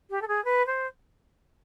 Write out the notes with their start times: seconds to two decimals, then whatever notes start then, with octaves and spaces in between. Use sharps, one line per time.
0.10 G4
0.22 A4
0.28 G#4
0.45 B4
0.67 C5